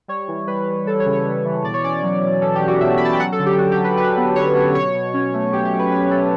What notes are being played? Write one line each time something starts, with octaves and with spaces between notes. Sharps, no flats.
G3 C#5
E3
G3 B4
G3
G3 A4
C#5
C#3
C#5
G3
E3
B2 D5
C#5
C#4 D5
F#3
B2
C#4 A4
G4
F#3
F#4
B2 E5
B5
C#4 A5
G5
F#3 F#5
A4
D3
G4
D3 F#4
G4
F#3
B4
D3 B4
B3
D3 C#5
F#3
B2 C#5
B2
C#4
A3
B2 G4
G4
F#3
B4
C#4 B4
A3 A4